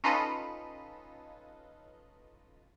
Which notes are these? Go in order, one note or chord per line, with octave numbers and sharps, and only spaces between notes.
C#4 D#4 F4 A4 B4 D#5